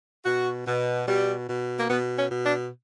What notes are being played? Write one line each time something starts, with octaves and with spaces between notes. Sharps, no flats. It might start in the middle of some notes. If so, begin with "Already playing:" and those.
B2 F#4
B2
B2 G3
B2
A#3
B2 B3
C#4
B2
D4